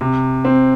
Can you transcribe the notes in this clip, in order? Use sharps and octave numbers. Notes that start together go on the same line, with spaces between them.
C3
C4